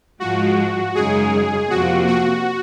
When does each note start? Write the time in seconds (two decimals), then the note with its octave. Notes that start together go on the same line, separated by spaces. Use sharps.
0.20 G#2 F3 G#3 F#4
0.95 F#2 C#3 G#3 D#4 G#4
1.70 F2 C3 F3 A#3 F#4
2.07 F#4